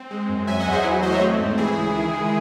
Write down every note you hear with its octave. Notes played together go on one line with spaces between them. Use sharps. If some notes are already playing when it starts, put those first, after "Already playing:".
Already playing: C4
G#3
F#2
F#3 E5 G#5
D#5 F#5
E2
G#4 C5
F#3 E4
F#4
A3 C5 D#5
C#5 E5
C4
G#2
E3 E4 G#4
C#2
D#3
G#3